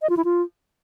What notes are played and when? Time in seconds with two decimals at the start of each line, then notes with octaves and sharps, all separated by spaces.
0.02 D#5
0.10 F4
0.17 E4
0.25 F4